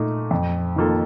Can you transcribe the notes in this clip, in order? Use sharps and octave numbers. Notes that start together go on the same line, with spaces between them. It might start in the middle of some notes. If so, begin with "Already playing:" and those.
Already playing: A#2 A3 D#4
F2
D#3 A#3 F4 A4